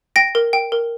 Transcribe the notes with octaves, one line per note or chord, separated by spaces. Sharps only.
G5 A#6 D7
A#4
G5
A#4